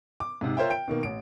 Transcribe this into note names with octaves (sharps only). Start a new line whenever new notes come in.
D6
G#2 C3
F4 A#4 C5 C#5 E5 G5
G5 D7
B2 D#3 A#3
A1 D7